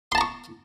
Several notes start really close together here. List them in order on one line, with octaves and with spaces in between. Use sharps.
C6 A5 A#5 C#6